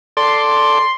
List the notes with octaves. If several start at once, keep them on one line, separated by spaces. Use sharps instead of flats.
A4 D5 C6